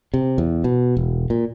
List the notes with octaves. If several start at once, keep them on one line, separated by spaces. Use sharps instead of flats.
C3
E2
B2
E1
A#2